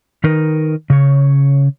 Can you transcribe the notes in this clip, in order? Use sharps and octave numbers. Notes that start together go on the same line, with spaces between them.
D#3 D#4 A#4 B4
C#3 C#5